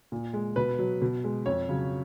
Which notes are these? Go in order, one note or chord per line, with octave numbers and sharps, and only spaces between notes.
A#2
G#3
B2 B4
F#3
B2
G#3
F2 C#5
C#3 F#3